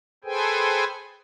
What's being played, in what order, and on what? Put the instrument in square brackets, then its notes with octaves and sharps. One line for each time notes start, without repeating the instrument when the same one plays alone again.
[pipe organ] G#4 A4 B4 C5 G5 G#5